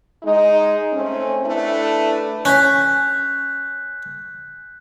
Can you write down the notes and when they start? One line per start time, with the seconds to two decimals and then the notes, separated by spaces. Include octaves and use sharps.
0.23 G#3 D#4
0.93 A3 C4 C#4
1.44 A3 D4 E4 A4 B4
2.45 C#4 F#6 G6 B6